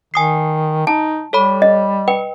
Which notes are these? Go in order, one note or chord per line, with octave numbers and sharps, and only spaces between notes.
D#3 G#5 D#6 C7
D#4 A5
G3 A4 C#5 B5
D#5
B4 G5